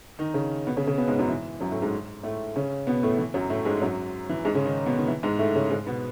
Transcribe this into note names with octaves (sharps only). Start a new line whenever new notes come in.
D#3 D#4
C#3 C#4
B2 B3
C#3 C#4
C#3 C#4
B2 B3
G#2 G#3
F#2 F#3
E3
F#2 F#3
A2 A3
G#2 G#3
A2 A3
C#3 C#4
B2 B3
A2 A3
E3
F#2 F#3
A2 A3
G#2 G#3
F#2 F#3
E3
G#2 G#3
C#3 C#4
D#3 D#4
B2 B3
D#3
E3
G#2 G#3
A2 A3
C#3 C#4
G#2 G#3
B2 B3